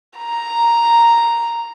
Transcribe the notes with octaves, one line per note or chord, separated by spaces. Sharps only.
A#5